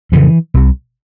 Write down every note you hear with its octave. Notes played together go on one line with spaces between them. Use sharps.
F2 C#3 E3
C2 C3